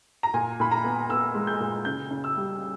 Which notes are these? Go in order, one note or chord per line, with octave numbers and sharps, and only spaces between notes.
A#5
A#2 G#5
A#2 B5
A#5
B3
B3 E6
G#3
G6
A#2
C#3 G6
C#3
E6
G3